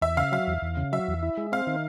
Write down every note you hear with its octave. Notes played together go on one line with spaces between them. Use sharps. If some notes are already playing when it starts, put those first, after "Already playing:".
E2 E5
C#3 F5
F#3 F5
E2
E2
C#3
F#3 E5
E2
E4
G#3
C4 F5
D#3